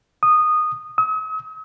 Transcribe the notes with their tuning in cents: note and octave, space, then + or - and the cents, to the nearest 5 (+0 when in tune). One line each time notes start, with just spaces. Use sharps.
D#6 -15
D#6 +45